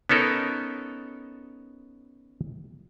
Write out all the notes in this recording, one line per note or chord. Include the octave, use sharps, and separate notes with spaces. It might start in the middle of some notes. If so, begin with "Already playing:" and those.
B3 C#4 D#4 A4 A#4